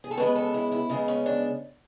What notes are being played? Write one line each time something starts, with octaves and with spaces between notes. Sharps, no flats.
G#4
A4
C#3 G#3 B3 B4
A4
E4
E4
C#3 G#3 B3
C#4
D4